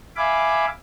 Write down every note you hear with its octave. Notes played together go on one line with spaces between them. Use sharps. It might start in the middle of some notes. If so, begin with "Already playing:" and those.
E5 F5 G#5 B5 D6